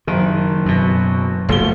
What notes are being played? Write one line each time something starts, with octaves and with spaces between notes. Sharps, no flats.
F#1 D#3
F#2 B2
F#1 F3 A3 G7